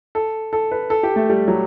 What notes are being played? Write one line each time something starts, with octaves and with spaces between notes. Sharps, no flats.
A4
A4
B4
A4
G4
A3
G3
F#3